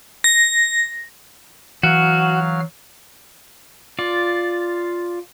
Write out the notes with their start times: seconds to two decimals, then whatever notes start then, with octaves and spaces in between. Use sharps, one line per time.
0.24 A#6
1.83 E3 F#3 F#4 F5 F6
3.99 F4 D5